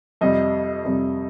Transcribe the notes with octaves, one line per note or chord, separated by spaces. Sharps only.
F2 C3 G3 D#5
F2 C3 G3